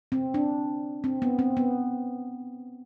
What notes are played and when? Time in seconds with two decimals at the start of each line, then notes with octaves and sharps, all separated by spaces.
0.12 C4
0.34 D4
1.04 C4
1.22 B3
1.39 C4
1.57 B3